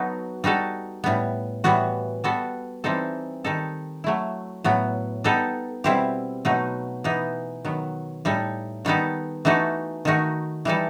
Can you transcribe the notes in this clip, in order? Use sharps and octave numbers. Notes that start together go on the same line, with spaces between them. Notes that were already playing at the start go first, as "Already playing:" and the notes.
Already playing: F#3 B3 D#4 F#4 A4
G3 D#4 F#4 A4
A2 G3 B3
A2 E3 G3 B3 F#4
G3 B3 F#4 A4
E3 G3 C4 D#4 A4
D#3 G3 D#4 A4
F#3 A3 E4
A2 F#3 B3
G3 B3 D#4 A4
B2 G3 C4 E4 G4
B2 F#3 A3 D#4
E3 B3 D#4
D#3 F#3 B3
A2 G3 D#4 A4
D#3 G3 B3 D#4 A4
E3 A3 D#4 F#4 A4
D#3 A3 D#4 F#4
E3 G3 D#4 A4